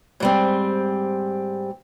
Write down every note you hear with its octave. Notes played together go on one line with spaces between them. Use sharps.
G#2 G3 C4